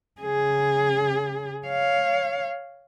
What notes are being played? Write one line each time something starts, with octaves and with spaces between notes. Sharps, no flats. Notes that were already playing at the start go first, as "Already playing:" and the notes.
C#3 G#4
C#5 F5